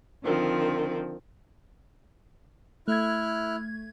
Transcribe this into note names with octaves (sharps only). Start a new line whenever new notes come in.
D3 D#3 F3 C4
A3 E4 F6 F#6 G#6